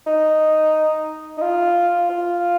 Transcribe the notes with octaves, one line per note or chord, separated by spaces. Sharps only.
D#4
D#4
F4
F4